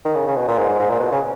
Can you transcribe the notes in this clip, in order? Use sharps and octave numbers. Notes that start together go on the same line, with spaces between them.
D#3
C#3
C#3
B2
A#2
G#2
G#2
G#2
A#2
B2
C#3